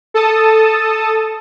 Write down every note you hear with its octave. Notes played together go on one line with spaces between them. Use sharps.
A4 A5 D#6